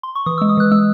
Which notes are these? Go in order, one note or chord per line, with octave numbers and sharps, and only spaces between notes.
C6
C#6
E3 D#6
G#3 E6
D#6
E3 F#6
G#3 E6